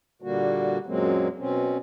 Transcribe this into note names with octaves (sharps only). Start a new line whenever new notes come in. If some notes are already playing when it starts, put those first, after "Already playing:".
A#2 D3 G3 A#3 F#4
F#2 A#2 F#3 G#3 A#3 C4
B2 C4 C#4